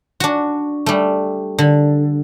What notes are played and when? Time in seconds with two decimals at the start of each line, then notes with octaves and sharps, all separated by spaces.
0.20 D4 F#4
0.86 G3 A3
1.59 D3